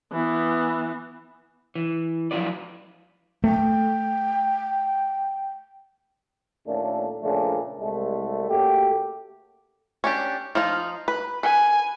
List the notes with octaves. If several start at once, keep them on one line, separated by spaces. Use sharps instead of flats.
E3 B3
E3
F3 F#3 E4 F4 B4 D5
A3 G5
D#2 A#2 A3 C#4 D4 A4
A#2 C#3 F3 A3 D4
C2 G#3 A3
C#3 A3 A#3 F#4 G4
C#4 D4 G4
F3 D#4 F4
B4
B4 G#5